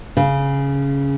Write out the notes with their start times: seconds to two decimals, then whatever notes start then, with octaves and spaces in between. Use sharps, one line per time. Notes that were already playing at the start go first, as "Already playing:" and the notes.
0.17 C#3